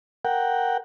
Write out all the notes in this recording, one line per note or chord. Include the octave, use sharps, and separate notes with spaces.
A#4 F#5 G5